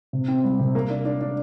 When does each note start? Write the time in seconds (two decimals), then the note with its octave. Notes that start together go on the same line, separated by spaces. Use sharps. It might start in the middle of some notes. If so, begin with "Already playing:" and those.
0.13 C3
0.28 C4
0.44 G3
0.59 C3
0.75 A#3
0.90 D4
1.05 D4
1.21 D4